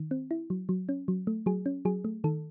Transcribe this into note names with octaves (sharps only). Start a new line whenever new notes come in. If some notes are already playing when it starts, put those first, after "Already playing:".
Already playing: D#3
C4
E4
F#3
F#3
C#4
F#3
A3
F#3 G#4
C#4
F#3 G#4
A3
D#3 A4